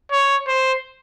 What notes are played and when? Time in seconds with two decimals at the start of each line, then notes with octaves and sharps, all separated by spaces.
0.12 C#5
0.48 C5